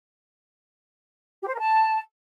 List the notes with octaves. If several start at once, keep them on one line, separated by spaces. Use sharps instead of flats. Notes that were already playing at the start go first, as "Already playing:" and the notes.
G4
C5
A#4
A5